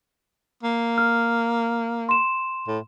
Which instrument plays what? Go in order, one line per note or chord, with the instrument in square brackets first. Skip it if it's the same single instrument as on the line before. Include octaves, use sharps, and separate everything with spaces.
[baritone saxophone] A#3
[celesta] F6
C6 E7
[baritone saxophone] A2